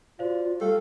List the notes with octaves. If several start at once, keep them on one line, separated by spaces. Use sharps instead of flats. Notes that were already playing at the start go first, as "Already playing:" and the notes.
F4 F#4 C5 D5 F5
G3 G4 A4 F5 G5